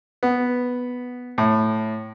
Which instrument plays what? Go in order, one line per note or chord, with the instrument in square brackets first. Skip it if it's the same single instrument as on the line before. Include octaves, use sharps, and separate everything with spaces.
[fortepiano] B3
A2